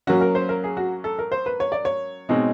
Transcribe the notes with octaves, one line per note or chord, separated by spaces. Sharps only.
F#3 A#3 C#4 F#4
A#4
C5
A#4
G#4
F#4
A4
A#4
C5
B4
C#5
D5
C#5
B2 G#3 C4 D#4